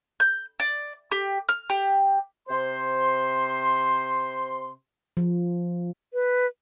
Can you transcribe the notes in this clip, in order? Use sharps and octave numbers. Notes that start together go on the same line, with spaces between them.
G6
D5
G4
F6
G4
C3 C5 C6
F3
B4